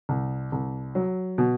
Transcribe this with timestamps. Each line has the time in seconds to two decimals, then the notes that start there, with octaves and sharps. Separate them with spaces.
0.09 C2
0.52 C2
0.95 F#3
1.38 B2